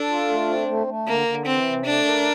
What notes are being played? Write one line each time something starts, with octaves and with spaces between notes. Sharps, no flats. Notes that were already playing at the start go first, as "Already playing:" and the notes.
Already playing: D4 A4
F4
A3
C4
A3
A3
D3 A#3
D3
E3 C4
C3
A3 D4
A#4